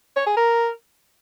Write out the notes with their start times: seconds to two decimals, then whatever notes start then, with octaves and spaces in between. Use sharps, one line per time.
0.16 C#5
0.27 G#4
0.37 A#4